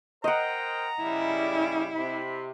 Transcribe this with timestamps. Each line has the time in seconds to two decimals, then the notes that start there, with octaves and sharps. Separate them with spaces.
0.24 A#4 C5 D#5 F#5 G5 A#5
1.02 C#3 G3 E4
1.96 C3 B5